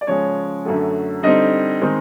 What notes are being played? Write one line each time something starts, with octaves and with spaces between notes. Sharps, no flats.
D5
C#3 F3 G#3 C#4 C#5
F#2 D3 F#3 A3
D3 G3 C4 D#4 D#5
D#3 G#3 C4 D#4